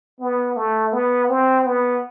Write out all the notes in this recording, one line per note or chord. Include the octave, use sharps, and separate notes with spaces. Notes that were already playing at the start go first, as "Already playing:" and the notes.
B3
A3
B3
C4
B3